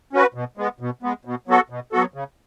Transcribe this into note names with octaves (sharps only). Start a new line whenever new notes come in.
C#4 F#4 B4
B2
G#3 B3
B2
G#3 B3
B2
F#3 B3 F#4 A4
B2
F#3 B3 F#4 A4
C#3